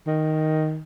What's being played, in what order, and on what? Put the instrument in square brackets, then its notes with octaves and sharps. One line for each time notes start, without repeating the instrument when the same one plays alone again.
[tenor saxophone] D#3